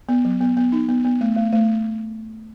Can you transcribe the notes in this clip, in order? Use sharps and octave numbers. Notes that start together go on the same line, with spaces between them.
B3
F#3
B3
B3
D#4
B3
B3
A3
A3
A3